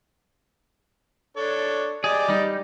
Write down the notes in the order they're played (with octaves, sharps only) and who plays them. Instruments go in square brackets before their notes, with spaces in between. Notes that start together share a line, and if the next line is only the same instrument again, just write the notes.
[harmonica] D4 A4 C#5
[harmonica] G4 D5 D#5 [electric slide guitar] G#4
[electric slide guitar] G3 D#4